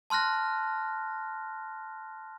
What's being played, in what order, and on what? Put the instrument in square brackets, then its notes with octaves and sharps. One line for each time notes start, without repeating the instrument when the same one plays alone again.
[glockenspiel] A5 C6 F6 F#6 A#6